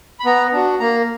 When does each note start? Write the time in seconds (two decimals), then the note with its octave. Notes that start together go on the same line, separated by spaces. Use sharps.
0.20 B5
0.25 B3 A#5
0.53 D4 F#4
0.80 A#3 A#5